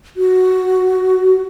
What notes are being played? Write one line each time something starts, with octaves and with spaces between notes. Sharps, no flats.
F#4